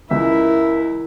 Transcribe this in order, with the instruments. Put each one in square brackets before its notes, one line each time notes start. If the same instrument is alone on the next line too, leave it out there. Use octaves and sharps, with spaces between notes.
[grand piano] C#2 E3 [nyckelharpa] E4 A#4 [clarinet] E5